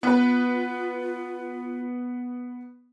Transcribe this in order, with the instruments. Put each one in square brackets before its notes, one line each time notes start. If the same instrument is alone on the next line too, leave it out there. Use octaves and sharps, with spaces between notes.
[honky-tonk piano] B3 B4 [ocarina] F4